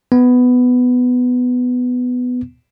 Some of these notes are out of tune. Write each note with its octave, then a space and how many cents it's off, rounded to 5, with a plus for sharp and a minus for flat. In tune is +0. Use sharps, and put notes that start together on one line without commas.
B3 +10